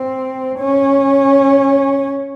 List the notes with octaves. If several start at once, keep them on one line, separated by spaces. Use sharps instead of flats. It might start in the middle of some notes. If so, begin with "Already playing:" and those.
Already playing: C4
C#4